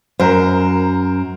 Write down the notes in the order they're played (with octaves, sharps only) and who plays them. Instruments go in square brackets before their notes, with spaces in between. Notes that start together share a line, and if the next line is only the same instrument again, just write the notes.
[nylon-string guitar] F#2 [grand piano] A#4 C5